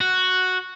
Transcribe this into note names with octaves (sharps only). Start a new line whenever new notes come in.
F#4